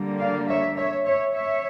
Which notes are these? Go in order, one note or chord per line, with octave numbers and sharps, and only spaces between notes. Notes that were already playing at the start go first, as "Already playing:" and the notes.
Already playing: D3 G3 A#3
D5 F5
C#5 E5
C#5 E5
C#5 E5
C#5 E5